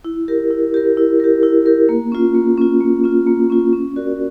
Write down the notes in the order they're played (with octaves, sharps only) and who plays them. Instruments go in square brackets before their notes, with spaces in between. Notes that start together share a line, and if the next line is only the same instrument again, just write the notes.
[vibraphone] E4
G4 A#4
E4
G4 A#4
E4
G4 A#4
E4
G4 A#4
A#3
C#4 F4
A#3
C#4 F4
A#3
C#4 F4
A#3
C#4 F4
C#4
F#4 A#4 D5